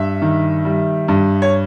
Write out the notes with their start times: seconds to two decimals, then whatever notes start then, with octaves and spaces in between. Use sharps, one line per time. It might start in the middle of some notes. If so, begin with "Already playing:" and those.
Already playing: G2 E5
0.22 D#3
0.65 G3
1.08 G2
1.42 C#5